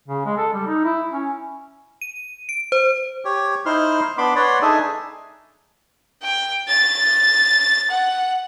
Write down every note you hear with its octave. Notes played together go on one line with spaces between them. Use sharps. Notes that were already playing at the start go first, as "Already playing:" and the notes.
C#3
G#3
A4
G3
D#4
E4
C#4
D#7
D7
C5
G4 C#5
D#4 E4 C5 C6 F6
B3 D4 B5 C6 D6
B4 C#5 D5 F#5 C6
D4 D#4 G#4 A4 E5 G#5
G5
A6
F#5